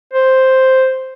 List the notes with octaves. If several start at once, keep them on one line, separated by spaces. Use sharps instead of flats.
C5